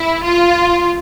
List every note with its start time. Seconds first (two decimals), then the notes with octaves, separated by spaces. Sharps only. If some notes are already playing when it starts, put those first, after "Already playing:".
Already playing: E4
0.23 F4